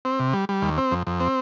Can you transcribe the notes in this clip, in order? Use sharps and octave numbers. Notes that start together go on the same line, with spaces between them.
C4
C3
G3
G3
D#2
C4
F2
F2
C4